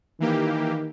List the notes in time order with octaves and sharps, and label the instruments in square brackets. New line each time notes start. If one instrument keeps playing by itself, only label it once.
[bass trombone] D#3 [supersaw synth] E3 A#3 G4